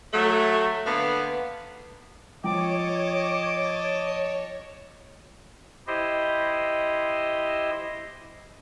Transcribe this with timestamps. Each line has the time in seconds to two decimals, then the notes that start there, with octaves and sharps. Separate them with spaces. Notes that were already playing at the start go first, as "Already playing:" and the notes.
0.14 F#3 A3
0.86 D3 A#3 B3
2.44 F3 C#5 D#5 G5 A5 D6
5.87 E4 G4 C5 D#5